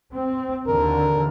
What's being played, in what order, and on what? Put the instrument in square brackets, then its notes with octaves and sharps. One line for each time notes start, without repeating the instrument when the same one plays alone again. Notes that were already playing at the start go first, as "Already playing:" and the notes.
[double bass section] C4
[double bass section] D#2 D3 E3 [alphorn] A#4